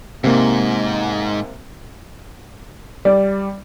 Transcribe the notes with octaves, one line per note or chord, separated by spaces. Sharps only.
G#2 C3 A#3
G3 D5